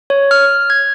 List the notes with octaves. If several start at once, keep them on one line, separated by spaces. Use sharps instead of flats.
C#5
F6
G#6